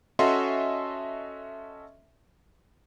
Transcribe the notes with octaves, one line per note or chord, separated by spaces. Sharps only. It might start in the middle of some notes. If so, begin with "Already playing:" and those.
C#4 F#4 A4 D#5 E5 C6